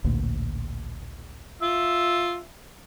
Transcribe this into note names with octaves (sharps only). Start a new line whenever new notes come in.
A1 D2 A#2
F4 E5